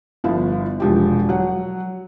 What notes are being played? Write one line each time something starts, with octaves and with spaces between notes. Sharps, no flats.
G1 F3 B3 E4 F5
E1 F3 G4
F#3 F#5